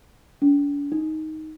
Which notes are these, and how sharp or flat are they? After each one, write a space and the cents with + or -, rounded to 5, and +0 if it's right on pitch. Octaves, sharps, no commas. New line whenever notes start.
D4 -45
D#4 +10